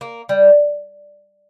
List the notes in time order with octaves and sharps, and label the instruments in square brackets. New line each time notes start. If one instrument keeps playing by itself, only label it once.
[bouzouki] A#3
G3